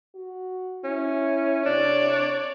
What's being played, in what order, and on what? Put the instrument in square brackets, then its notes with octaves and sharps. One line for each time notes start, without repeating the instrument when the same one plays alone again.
[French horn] F#4
[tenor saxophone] C#4 [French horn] E4
[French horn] C3 [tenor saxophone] D4 [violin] C#5 D5